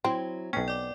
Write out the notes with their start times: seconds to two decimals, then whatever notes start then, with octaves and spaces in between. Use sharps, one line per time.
0.05 F#3 C4 E4
0.53 B1 B3 C#4 G5
0.68 D5 D6